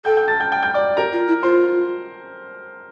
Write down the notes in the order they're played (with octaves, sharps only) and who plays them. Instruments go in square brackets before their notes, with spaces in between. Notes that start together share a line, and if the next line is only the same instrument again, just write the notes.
[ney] A4 [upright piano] G5 G6
[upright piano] G5 G6
A5 A6
G5 G6
G5 G6
G5 G6
D5 D6
[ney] G4 [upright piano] A#4 A#5
[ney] F4
E4
[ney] F4 [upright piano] C5 C6